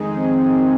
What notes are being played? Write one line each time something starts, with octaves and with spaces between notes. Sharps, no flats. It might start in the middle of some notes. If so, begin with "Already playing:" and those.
Already playing: F2 D#3 G#3 D#4 G#4
C4